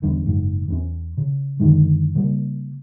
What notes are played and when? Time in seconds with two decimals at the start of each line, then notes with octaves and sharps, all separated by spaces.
0.02 G1 E2 G2 D3
0.26 F#1 G#2
0.68 E2 B3 C#4
1.17 C#3
1.60 F#2 D3 D#3 G#3
2.15 C#3 G3 A#3